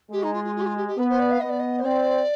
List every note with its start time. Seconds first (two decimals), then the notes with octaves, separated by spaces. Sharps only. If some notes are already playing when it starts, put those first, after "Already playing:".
0.11 G#3 G4
0.22 D#4
0.33 F4
0.44 F4
0.55 F4
0.60 G4
0.65 F4
0.76 G4
0.87 G4
0.98 B3 B4
1.08 C5
1.19 D5
1.30 F5
1.40 B3 D#5
1.49 D5
1.59 D#5
1.79 C5
1.84 C4 D5